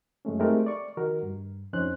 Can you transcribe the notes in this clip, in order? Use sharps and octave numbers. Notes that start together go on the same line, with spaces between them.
F#2 G#3 A3 C#4
G#3 A3 C4 D#4 G4 A#4
D5 C#6
D#3 D#4 F#4 A#4
G2
F2 C#4 D#4 C5 F#6